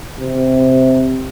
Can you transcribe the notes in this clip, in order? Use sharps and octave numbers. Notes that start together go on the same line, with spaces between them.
C3